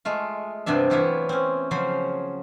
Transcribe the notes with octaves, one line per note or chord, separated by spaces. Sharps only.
G#3 A3 F4
G2 C3 B3 D4 E5
E3 F#3 E4 F4 G4 C#5
C4 C#4
C#3 F3 F#3 C5 B5